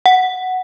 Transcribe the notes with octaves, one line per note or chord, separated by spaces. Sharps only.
F#5